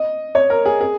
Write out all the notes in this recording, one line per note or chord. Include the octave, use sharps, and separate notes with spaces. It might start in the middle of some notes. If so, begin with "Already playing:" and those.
Already playing: D#5
C#5
A#4
G#4
G#4